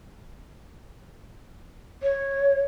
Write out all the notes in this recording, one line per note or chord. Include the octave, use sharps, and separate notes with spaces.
C#5